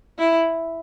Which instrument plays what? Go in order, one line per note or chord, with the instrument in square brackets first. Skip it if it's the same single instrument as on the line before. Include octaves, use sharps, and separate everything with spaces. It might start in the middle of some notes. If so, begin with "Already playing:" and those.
[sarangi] E4